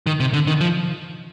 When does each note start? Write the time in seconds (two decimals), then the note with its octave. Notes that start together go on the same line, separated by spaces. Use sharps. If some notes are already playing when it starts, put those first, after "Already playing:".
0.07 D#3
0.20 C3
0.33 D3
0.47 D#3
0.61 F3